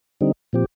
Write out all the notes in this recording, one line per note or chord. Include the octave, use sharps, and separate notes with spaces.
D3 G3 C4 D#4
A#2 F3 C4 G4